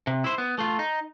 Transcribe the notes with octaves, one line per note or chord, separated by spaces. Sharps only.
C3
E4 C5
B3
A3 F4
D#4